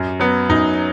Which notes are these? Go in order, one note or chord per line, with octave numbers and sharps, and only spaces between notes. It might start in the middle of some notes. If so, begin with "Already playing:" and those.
Already playing: F#2
F#3 B3
F#2 D#4